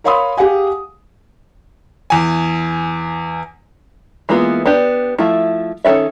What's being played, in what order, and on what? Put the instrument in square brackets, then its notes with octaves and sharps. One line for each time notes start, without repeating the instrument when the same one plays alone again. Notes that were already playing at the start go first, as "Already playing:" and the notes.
[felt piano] A#4 C#5 F5 B5 C6 D#6
G4 G#4 F5 F#5 G#5
[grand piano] E2 G#5
[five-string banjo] E3 G#3 A#3 B3 F4
B3 D4 G4
F3 A3 E4
D#3 C#4 A4 D5 E5